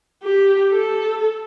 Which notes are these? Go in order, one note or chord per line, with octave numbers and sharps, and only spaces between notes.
G4
A4